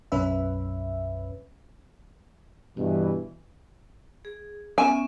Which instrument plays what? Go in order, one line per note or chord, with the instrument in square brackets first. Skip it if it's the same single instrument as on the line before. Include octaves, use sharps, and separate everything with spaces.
[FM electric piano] B1 F#2 C#4 B4 E5
[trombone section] G2 B2 E3
[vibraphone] G#4
[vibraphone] B3 C#4 E5 [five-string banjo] G#5